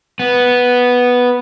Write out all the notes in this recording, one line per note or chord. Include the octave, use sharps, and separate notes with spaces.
B3